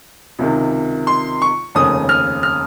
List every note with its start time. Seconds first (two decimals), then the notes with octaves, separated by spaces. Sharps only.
0.39 C#2 C3 D#3
1.07 C6
1.42 C#6
1.75 F1 D#2 C#3 D#6
2.09 F6
2.43 F6